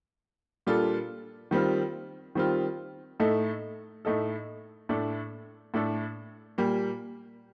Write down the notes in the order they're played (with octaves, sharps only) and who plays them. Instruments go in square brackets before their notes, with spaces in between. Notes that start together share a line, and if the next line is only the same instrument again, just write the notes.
[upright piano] A#2 G3 D4 F4 A4
D#3 G3 C4 F4
D#3 G3 C4 F4
A2 A3 D#4 A4
A2 A3 D#4 A4
A2 A3 D4 A4
A2 A3 D4 A4
A#2 G3 A#3